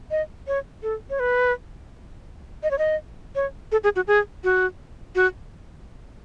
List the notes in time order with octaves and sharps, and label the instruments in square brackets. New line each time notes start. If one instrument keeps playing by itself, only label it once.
[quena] D#5
C#5
A4
C#5
B4
D#5
C#5
D#5
C#5
A4
G#4
F#4
G#4
F#4
F#4